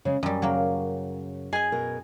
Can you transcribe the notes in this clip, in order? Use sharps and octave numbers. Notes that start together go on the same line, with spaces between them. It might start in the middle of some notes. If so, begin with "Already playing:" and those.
C#3 G#3
F#2 G3 D#5
C#3 F#3 A#3
G#4 D#5 G#5
B2 A#4